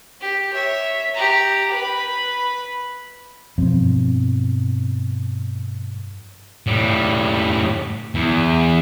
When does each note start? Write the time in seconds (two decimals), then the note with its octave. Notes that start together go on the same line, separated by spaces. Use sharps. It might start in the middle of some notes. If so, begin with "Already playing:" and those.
0.21 G4
0.53 C#5 E5
1.14 G4 A#5
1.70 B4 B5
3.58 G2 B2 F3 C4
6.67 A2 G3
8.15 E2